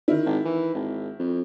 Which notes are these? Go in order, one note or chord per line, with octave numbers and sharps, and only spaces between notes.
D#3 E4
G#1
E3
G#1
F2